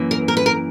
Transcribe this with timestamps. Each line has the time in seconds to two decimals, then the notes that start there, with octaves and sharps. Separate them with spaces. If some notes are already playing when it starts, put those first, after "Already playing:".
Already playing: F#2 E3 A#3
0.11 A#4
0.28 A#4
0.37 B4
0.46 A#4